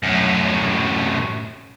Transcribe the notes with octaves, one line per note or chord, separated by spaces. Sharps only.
F#2 A2